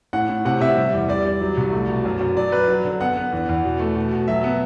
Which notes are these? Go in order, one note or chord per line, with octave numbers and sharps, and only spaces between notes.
A2 F#5
A2
C3 F#5
C3 E5
G3
E2
G3 D5
G3
F#3
C2
A3
B2
F#2
F#2
F#3 D5
F#2 B4
F#3
D3
B3 F#5
B3
E2
E2
B2
A3
B2
B2
F#3 E5
B3